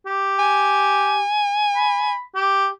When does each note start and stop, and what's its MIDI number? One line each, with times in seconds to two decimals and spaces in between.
0.06 1.22 67
0.39 2.13 80
1.75 2.21 83
2.35 2.67 67